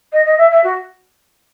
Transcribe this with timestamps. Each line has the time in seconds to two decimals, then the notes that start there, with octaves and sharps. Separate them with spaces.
0.12 D#5
0.25 D#5
0.38 E5
0.51 E5
0.64 F#4